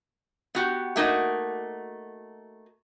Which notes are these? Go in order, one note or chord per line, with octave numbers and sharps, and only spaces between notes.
B3 F#4 G4
A3 A#3 D#4 F#4